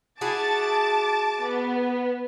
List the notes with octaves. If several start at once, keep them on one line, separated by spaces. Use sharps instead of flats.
E4 F#4 G#4 A5 D6 A6
B3